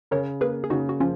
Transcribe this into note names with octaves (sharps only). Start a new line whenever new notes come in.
C#3 A#4 C#5
A#3 G#4 B4
G#4
C#3 D#4 F#4
F#4
F3 C#4 F4